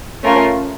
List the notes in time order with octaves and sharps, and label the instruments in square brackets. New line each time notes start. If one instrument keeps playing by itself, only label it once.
[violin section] A3 C#4 F4 A#4